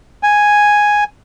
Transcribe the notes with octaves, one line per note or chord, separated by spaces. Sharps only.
G#5